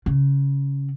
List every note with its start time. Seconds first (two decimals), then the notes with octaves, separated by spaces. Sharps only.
0.06 C#3